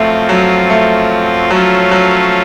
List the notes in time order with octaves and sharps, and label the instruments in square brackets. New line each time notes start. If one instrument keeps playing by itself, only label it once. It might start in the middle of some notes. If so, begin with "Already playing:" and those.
Already playing: [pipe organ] F#2 F3 C4 F4 [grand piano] A3
[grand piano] F#3
A3
[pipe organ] F3 A3 C#4 F4 [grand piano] F#3
[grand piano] F#3